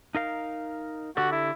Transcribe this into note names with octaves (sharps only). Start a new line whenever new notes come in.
D#4 A#4 F5
D3 F#4 G4 A4
E4